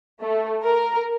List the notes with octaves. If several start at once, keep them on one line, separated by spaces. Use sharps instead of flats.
A3
A#4